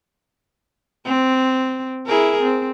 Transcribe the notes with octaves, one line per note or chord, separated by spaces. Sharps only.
C4
E4 G#4 A#4
C4